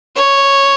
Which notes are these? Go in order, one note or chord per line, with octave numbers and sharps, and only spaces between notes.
C#5